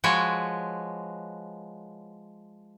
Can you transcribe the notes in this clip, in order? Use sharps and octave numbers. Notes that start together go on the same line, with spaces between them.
F3 G#3 F#4 B4 C#5